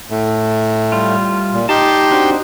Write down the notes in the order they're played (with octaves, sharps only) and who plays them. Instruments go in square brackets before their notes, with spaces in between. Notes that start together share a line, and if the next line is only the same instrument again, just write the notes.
[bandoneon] A2 A3
[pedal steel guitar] G3 F4
[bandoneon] A#2
[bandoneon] D#4 G4 C6 [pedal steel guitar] A5
[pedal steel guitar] C4 D4 F#4